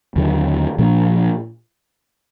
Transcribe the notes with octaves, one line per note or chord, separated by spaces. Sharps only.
D#2 D3 F#3
A#2 F3 A#3 D4